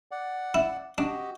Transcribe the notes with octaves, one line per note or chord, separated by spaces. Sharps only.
D5 F#5
E4
D4 F#4 G4 D#5